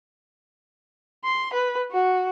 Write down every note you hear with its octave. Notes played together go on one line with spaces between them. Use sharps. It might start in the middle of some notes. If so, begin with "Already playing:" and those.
C6
B4
F#4